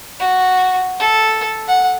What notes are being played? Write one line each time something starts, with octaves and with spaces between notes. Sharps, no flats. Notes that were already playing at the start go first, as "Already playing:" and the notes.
F#4
A4
F#5